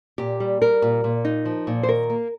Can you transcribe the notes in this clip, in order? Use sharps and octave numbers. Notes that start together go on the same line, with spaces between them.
A#2 G4
G3
G3 A#4
A#2
A#2
D#4
F3
A#2
C5
D#3 A#4
A#3